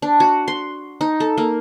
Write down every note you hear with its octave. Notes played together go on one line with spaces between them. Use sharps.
D4
F#4
C6
D#4
A4
A#3